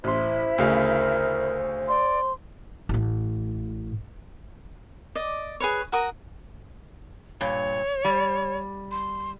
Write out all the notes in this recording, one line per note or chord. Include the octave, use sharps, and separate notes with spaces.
A1 E4 C5 E5 B5 C6
D2 C#3 A#4 F5
D5 C6
A1 A2
D5 D#5
G#4 B4 C#5
F#4 A#4 D#6
G2 A#2 C#5
G3
C6